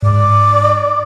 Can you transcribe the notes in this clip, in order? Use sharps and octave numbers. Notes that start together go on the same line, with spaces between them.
G#2 D5